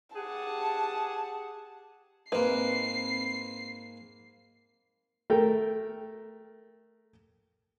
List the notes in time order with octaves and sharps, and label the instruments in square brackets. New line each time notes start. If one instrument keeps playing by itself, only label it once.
[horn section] G4 G#4 F#5 [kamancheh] A5
[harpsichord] G#2 A#3 [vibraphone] C4 B5 C6 [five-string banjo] B4 [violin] C7
[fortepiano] A3 A#4 G5